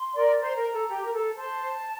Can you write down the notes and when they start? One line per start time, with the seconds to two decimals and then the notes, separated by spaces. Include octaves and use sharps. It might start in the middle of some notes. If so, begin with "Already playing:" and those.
Already playing: C6
0.16 A#4 D5
0.40 C5 A#5
0.56 A#4
0.73 A4
0.89 G4
1.04 A#4
1.13 A4
1.37 C5 A5